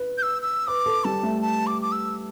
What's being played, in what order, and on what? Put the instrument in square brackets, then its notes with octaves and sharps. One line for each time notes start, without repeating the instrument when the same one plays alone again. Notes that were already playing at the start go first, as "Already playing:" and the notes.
Already playing: [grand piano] B4
[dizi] G6
E6
E6
[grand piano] B4 [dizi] D6
[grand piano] A4
[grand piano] G3 [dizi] A5
[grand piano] A3
[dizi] A5
D6
D6
E6